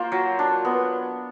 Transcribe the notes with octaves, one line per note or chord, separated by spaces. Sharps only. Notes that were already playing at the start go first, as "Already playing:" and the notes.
Already playing: A#3 F4 C5
F#3
D4
B3